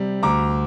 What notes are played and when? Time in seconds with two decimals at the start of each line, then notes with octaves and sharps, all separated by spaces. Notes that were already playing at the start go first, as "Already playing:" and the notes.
Already playing: C3 G3
0.23 D2 A#5 D6